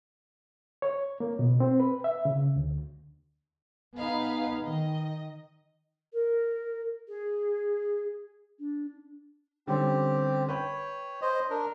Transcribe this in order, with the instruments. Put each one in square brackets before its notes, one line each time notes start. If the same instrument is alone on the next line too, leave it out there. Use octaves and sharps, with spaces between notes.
[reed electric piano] C#5
A#3
B2
C4
B4
E5
C#3
D2
[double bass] B3 D#4 [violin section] G#4 B4 F5
[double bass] D#3 [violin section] D#5
[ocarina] A#4
G#4
D4
[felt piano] D3 G3 C#4 [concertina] C4 G4
[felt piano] B4 G5 [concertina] C#5
[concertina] C5 D#5
D4 A#4